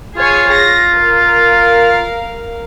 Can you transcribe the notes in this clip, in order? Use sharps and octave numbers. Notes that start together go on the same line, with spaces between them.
F4 G#4 C#5 G#5
A#6
A#4 F5